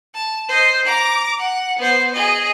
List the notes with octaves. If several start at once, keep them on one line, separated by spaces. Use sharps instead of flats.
A5
C5 D#5
A#5 D6
F#5
B3 C5
G#4 D#5